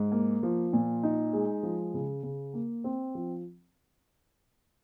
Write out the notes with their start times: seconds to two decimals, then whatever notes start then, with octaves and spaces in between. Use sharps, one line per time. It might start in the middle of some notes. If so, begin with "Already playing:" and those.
Already playing: G#2
0.12 A#3
0.43 F3
0.73 A#2
1.03 D#4
1.33 G#3
1.63 F3
1.94 C#3
2.23 C#3
2.54 A#3
2.84 C4
3.15 F3